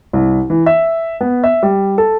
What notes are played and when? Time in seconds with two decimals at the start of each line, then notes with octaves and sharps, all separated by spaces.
0.13 C2
0.50 E3
0.66 E5
1.21 B3
1.44 E5
1.63 G3
1.98 A4